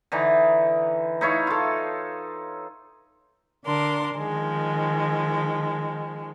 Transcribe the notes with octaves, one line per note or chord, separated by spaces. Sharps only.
D3 E3 D#4
D#4 E4 C#5 F5
F4 A4
D3 D4 A#4 C6
D#3 F3 G#3